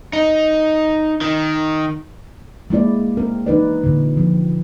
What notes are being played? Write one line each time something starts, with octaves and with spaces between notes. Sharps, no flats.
D#4
D#3
G#3 A#3 E4 D5
C4 A#4
E3 D#4 B4 D5
A#2 D3
F3 C4